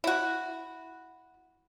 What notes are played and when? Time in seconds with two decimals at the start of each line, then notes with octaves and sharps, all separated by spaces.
0.04 E4 F#4